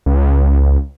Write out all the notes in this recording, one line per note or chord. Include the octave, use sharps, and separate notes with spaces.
C#2